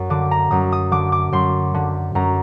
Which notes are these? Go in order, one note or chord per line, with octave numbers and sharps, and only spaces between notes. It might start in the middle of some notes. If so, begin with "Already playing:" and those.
Already playing: F#2
D3 D6
A#5
F#2 D#6
D#6
D3 D6
D6
F#2 C6
D3
F#2 A#5